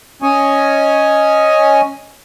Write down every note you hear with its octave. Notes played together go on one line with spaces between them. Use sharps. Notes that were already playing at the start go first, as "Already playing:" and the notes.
C#4 C#5 D#5 G#5